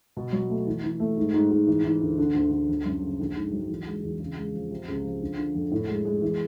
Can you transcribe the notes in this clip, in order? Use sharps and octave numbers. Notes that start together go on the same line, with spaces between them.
B2
F#3
A3
E3
E3
A3
G#2
G#2
G#2
E3
E3
D2
D3
D2
D2
G1
F#2
C#3
A#1
G#2
F#3
E3
G#3
E2
C#3
G#3
F3
C3
C#2
F3
D3
D3
F2
A2
G#3
G#3
E3